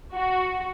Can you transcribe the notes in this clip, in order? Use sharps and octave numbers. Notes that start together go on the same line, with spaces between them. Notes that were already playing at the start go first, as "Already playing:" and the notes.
F#4